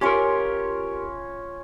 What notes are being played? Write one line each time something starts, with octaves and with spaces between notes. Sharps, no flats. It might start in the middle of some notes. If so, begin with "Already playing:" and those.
C#4 F4 G4 A#4 C#5